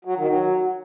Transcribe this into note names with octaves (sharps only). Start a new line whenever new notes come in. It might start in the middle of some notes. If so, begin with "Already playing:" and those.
F#3
D#3
F#3